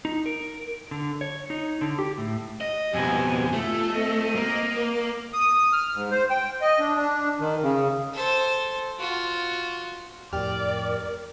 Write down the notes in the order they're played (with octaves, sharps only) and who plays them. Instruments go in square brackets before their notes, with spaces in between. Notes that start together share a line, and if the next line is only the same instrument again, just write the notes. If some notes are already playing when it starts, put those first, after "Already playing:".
[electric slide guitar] D#4
A#4
D3
C#5
D#4
D3
G4
A2
[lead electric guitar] D#5
[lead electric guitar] F2 B2 [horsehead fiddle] G4 G#5
[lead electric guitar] A3 [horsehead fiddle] F4
[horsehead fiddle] C4 D#5
[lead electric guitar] A#3
[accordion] D#6
F6
G#2
C5
G5
D#5
D4
D4
D#3
C#3
[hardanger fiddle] A4 C5
F4 F#4
[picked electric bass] F2 A2 [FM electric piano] G4 F6 [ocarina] A#4 [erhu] D5